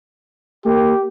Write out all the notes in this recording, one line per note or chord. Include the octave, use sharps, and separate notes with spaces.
A#3 G4